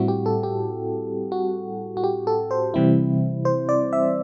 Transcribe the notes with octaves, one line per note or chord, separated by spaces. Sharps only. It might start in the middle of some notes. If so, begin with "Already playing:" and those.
Already playing: A2 G3 C4 E4 F#4
G4
A4
G4
F#4
F#4
G4
A4
C5
C3 E3 G3 C4 E4
C5
D5
E5